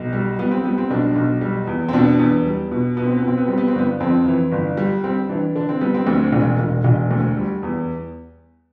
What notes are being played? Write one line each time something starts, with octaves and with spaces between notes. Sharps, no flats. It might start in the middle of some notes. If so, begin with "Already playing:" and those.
Already playing: B1
G3
G3 B3
C4
G3 B3
C4
B1 D4
B1
G3
E2
C4
B2 D4
E2
G3
B2
B2 B3
C4
B3
B2
C4
B3
G3 C4
B3
C4
G1 B3
F2 C4
E3
G1
G3
G3 C4
E3 D4
D3 D4
C4
G3 B3
C4
D2
E1
E1
E1
D2
G3
E2